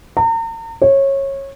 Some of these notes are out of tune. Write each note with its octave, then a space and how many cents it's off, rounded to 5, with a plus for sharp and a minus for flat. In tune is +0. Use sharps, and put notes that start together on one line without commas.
A#5 -40
C#5 -20